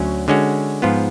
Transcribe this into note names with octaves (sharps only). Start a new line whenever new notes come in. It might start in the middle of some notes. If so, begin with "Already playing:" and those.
Already playing: D2 F#3 C#4
D3 G#3 C#4 F#4
G#2 F3 B3 F4